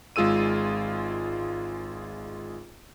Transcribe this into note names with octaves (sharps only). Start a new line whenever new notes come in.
G#1 G#3 F4 G#4 E6 D#7